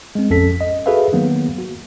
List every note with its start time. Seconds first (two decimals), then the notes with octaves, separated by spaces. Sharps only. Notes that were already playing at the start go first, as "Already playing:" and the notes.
0.15 G#3 C4
0.30 A1 F2 C#4 A4 B6
0.61 D#5
0.86 F#4 G#4 A4 B4 E5 F5
1.13 D#3 F#3 A#3 B3
1.58 F#4